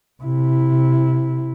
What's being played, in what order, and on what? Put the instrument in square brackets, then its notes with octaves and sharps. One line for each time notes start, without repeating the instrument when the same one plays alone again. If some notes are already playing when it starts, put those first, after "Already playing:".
[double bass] C3 E4